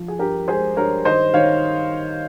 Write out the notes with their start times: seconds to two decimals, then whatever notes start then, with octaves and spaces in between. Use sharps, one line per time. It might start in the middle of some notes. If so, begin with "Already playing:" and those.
Already playing: F3
0.08 G#4
0.19 G2 G4 A#4
0.48 G#3 G#4 C5
0.76 G2 A#4 C#5
1.05 D#3 C5 D#5
1.33 D#3 C#5 F5